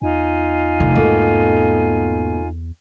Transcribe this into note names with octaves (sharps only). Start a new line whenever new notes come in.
E2 D#4 F4 G#5
F1 D3
G#2 B2 A3 A#3